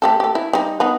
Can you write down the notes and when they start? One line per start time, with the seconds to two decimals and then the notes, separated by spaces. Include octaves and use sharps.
0.02 A3 G4 A4
0.20 G4 A4
0.35 E4
0.53 G3 D#4
0.80 B3 D#4 B4